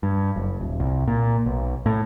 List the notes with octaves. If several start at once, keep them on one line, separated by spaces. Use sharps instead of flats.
G2
F#1
D#1
C2
A#2
B1
A2